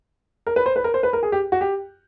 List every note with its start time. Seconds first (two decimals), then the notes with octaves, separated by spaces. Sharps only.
0.47 A#4
0.56 B4
0.66 C5
0.76 B4
0.84 A#4
0.94 C5
1.03 B4
1.13 A#4
1.23 G#4
1.32 G4
1.52 F#4
1.61 G4